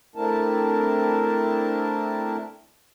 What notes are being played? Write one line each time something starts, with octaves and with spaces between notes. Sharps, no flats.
A3 C4 D4 E4 A#4 A5